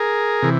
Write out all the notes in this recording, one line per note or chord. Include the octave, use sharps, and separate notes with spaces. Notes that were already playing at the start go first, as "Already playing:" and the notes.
Already playing: G#4 A#4
C3 E3